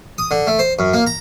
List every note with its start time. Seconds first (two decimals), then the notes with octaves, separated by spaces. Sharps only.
0.18 D#6
0.31 D3
0.47 A3
0.59 C5
0.79 F#2
0.94 A#3
1.07 A#5